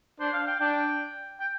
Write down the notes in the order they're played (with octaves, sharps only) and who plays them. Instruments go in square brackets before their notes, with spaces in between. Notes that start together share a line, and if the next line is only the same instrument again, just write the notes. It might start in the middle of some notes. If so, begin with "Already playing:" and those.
[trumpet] D4 [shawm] C5
[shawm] F5
G5
[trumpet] D4 [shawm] G5
[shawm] G5